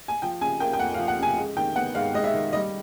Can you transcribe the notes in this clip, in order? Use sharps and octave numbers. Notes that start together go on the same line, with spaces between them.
G#5
F3 G5
C#3 G#5
A#3 G5
G5
F2 F#5
F5
F3
F#5
C#3 G#5
G#3
D#3 G5
B3 F#5
G#2 F5
G#3 D#5
E5
D#3
G3 D#5